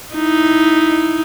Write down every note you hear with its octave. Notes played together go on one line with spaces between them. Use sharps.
D#4 E4